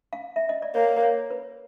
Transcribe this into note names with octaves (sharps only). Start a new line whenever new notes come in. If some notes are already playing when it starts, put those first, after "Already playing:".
F5
E5
D#5
D5
A#3 C#5
C#5
B4